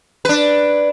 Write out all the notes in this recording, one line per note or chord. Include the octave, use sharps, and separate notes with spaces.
D4 B4